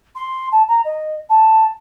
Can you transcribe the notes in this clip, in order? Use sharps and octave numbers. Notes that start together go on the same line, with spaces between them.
C6
A5
A#5
D#5
A5